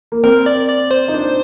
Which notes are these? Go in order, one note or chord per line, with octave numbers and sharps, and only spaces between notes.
A#3
C4 A#4
D5
D5
C5
D#4
D4